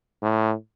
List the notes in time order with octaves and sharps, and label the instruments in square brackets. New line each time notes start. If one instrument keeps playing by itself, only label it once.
[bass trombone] A2